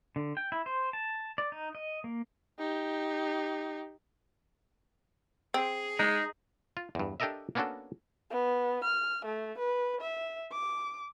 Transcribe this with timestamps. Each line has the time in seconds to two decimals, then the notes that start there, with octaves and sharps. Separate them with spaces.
0.16 D3
0.37 G5
0.52 E4
0.66 C5
0.93 A5
1.38 D5
1.52 D#4
1.75 D#5
2.04 A#3
2.59 D#4 G4
5.54 C4 G#4
5.99 G#3 D#4
6.77 F4
6.95 E2 G2
7.20 D4 G4 A4 A#4 D#5 E5
7.55 A#3 B3 C#4 D4 F#4 A4
8.30 B3
8.84 F6
9.25 A3
9.58 B4
10.01 E5
10.52 D6